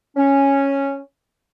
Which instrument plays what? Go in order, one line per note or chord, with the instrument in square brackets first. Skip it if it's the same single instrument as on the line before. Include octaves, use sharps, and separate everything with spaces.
[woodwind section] C#4